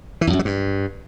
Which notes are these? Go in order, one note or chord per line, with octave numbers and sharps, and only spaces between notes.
E3
E2
F#2
F#3
G2